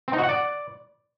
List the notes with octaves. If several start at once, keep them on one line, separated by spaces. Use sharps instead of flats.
C4
D#4
F#4
F#5
D5